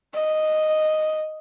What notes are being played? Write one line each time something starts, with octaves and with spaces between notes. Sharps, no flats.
D#5